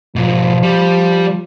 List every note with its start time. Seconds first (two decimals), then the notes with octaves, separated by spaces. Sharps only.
0.16 G#2 B2 F3
0.63 G3